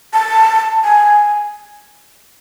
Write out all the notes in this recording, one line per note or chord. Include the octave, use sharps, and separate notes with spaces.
A5
G#5